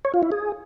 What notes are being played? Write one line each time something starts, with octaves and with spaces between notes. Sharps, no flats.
C#5
F4
E4
G#4